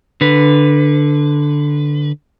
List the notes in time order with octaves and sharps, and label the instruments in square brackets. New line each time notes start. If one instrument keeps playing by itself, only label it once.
[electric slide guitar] D3 B4